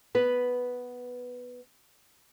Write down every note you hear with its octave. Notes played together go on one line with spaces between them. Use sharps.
B3 B4